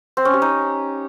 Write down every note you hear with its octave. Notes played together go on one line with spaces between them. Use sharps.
C4
C#4
G4
D#4